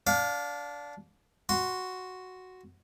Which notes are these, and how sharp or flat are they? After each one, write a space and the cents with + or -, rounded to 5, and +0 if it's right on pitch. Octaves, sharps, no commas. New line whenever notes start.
D4 -15 F5 +25
F#4 +0 C6 +0